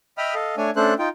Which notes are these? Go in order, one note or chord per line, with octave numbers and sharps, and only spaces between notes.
D#5 E5 G5 B5 D#6 F6
A4 D#5 F5
A3 D4 C#5 G#5
A3 C#4 D4 A4 C5 F#6
D#4 F4 G5